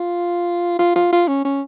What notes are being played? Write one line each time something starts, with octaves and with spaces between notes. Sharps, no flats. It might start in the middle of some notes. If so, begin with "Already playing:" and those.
Already playing: F4
F4
F4
F4
C#4
C#4